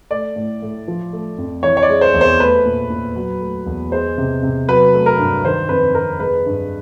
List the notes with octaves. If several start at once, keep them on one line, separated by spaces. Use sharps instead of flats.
A3 D5
A2
A2
F3
A3
F2
E3 C#5
C#5
D5
G#3
C5
E2
C5
A3 B4
A#2
A#2
F#3
A3
E2
G#3 C5
C3
C3
F#3 B4
A3
A#4
G2
D#3 C5
F2 B4
F2 A#4
G#3 B4
G2